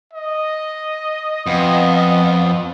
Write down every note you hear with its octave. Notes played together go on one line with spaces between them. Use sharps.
D#5
F2 B3